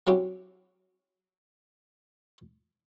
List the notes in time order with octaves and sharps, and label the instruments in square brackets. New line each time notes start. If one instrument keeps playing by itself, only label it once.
[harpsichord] F#3 C4 C#4 E4 F#4 G4